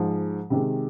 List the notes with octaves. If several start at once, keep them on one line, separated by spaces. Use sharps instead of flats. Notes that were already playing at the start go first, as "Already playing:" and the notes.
Already playing: G#2 F3 G#3
C3 D#3 G#3